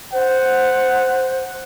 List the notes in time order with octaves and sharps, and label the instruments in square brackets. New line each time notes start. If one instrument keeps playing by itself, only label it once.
[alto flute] C5 [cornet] F#5